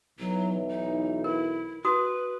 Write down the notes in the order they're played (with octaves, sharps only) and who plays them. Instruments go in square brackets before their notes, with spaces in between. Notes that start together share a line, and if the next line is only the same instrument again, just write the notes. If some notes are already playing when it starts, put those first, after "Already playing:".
[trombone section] B1 E3 [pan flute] F#3
[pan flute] D#4
[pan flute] E4 [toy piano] A#4
[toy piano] F#4 D#6 [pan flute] B4